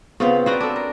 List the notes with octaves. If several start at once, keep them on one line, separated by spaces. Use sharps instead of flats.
C#3 B3 C4 F4 F5
B3 F#4 C5 D5 A#5
D4 A4
A#4